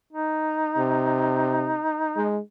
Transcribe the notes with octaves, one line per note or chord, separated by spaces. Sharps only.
D#4
C3
G#3